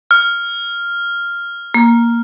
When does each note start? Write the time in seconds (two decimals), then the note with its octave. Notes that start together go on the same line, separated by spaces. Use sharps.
0.11 F6
1.74 A#3